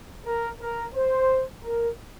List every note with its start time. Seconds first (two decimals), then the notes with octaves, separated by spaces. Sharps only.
0.25 A#4
0.61 A#4
0.95 C5
1.64 A#4